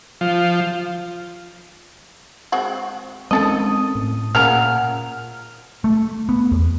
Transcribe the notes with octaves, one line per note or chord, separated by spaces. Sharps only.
F3
G#3 C4 F#4
D#3 G#3 C4 C#4 A4 D#5 D#6
A2
A#2 C#3 A#3 A#4 F#5 F6
A3
B3
E2